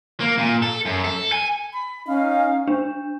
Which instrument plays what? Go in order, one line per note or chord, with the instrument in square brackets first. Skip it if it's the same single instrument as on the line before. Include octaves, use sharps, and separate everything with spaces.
[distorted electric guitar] A#3
A#2
A4
F#2
A4
G#5
[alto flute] B5
[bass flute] C#4 [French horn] D#4 [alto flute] F5
[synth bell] D4